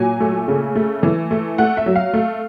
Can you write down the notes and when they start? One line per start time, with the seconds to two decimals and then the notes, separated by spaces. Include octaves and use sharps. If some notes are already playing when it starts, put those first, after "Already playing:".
Already playing: A#2 F#3 G#5
0.20 A3
0.48 C#3
0.76 A3
1.03 E3
1.31 A3
1.58 A3 F#5
1.77 E5
1.86 F#3
1.96 F5
2.14 A3